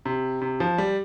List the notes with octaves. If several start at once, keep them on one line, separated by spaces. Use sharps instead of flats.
C3
C3
F3
G3